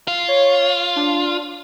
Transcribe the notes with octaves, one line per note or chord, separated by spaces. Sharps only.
F4 C7
C#5
D4